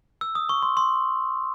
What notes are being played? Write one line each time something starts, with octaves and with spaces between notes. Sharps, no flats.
E6
D#6
C#6
C6
C6